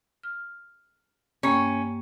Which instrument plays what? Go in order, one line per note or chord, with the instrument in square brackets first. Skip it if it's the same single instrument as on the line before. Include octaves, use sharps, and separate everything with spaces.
[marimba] F6
[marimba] G2 A#3 G5 [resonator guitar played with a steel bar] C#4